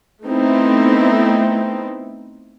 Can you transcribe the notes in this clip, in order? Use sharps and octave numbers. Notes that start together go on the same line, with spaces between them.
A3 B3 C4 D#4 E4